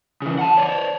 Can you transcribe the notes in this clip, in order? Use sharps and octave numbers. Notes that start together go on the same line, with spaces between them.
C#3 E3
F#5 A5
C#5 D5